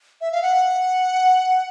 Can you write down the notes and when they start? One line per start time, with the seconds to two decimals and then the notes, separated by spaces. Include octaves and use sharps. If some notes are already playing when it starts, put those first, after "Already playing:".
0.21 E5
0.32 F5
0.42 F#5